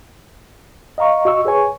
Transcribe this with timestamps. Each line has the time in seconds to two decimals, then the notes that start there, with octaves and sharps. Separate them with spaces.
0.98 D#5 F5 A#5 C#6
1.25 F#4 D#5 C#6 E6
1.45 G#4 B4 C#5 G#5 C#6